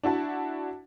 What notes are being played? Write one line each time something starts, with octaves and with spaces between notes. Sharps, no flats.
D4 E4 F#4 A5